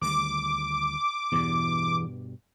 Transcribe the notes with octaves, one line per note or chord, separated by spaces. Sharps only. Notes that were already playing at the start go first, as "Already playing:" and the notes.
D2 D#3 G3 D6
E2 G2 B2